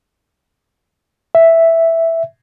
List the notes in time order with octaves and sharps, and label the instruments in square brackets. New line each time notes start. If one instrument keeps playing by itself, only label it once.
[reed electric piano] E5